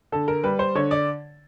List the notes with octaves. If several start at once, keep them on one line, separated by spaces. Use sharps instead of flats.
D3 A4
A#4
G3 B4
C5
D3 C#5
D5